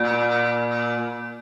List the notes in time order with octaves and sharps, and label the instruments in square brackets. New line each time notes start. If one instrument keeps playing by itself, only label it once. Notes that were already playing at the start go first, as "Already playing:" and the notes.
Already playing: [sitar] A#2